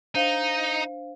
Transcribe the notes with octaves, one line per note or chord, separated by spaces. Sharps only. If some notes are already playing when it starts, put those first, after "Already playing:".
D4 D#4 C5 F5